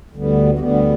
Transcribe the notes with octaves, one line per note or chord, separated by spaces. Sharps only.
D2 D3 G3 B3
F#4
D2 D3 G3 B3 G4
F#4